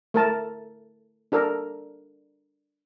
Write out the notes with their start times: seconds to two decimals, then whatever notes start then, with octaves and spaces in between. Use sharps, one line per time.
0.14 A3 A#4 A5
1.32 D4 A4 A#4